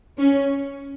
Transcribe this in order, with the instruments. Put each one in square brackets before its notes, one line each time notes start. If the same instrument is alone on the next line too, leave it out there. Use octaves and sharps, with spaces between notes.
[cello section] C#4